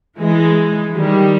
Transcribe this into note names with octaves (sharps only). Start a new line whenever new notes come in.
E3 G#3
D#3 G3